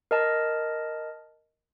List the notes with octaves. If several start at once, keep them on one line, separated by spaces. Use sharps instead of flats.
A#4 D#5 A5